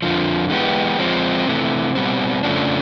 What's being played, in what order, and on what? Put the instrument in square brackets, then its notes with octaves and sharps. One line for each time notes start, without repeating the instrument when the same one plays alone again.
[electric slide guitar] F2 D3 F3
E3 G#3 B3 E4 G4
F3 G#3 C4
C3 E3 A3
B2 G3 C4
F2 C#3 F3 A3 D4